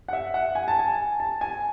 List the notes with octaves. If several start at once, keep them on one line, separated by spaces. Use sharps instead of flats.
F#5
E5
F#5
G#5
A5
G#5
A5
G#5